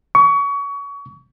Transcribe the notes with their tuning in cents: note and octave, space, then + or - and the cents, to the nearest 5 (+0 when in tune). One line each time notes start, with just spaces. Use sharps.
C#6 +30